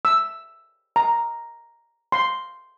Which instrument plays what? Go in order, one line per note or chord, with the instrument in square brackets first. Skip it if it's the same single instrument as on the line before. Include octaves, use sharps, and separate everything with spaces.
[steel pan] E6
A#5
C6